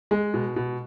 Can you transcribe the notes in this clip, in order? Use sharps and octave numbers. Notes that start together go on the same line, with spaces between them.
G#3
B2
B2